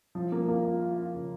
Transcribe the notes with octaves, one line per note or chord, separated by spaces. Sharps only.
F3
A#3
A#3
F4
F4
F4
C#3